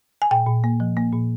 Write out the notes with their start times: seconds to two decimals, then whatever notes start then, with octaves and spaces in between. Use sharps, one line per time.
0.22 G#5
0.31 A#2 G5
0.47 A#2
0.64 A#3
0.80 F3
0.97 A#3
1.13 A#2